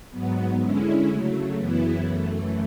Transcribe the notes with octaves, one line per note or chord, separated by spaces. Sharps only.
G#2 F#3 B3
D3 G#3 C#4 E4
C#3 F#3 A3
F#2 C#3 E3 B3 E4
F#2 E3 A3